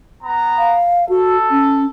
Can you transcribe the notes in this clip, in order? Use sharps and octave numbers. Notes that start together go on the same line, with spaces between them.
B3 A#5
F5
F#4 A4
C#4